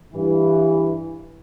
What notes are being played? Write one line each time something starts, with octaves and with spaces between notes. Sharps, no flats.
G2 E3